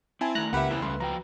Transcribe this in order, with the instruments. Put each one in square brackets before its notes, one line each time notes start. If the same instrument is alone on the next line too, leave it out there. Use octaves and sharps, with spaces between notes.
[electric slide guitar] C4 [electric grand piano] E4 G#5 A5
[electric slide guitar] D#3 A3 [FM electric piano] A#5 F#6
[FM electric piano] C#2 B4 [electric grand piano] A#3 G4 E5 [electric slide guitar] F#5
[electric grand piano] E2 [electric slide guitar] C3 E4
[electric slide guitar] G3 A3 C#4 [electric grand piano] C6
[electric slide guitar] F3 F#4 G5 [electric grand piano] A#5